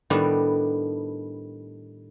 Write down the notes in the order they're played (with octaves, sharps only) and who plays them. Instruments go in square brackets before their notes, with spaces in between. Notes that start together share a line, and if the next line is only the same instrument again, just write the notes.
[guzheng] A2 D#3 G3 B3 D4